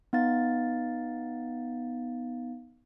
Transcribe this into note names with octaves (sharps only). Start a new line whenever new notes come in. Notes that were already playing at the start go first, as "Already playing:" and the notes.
B3 D#4 F5 A6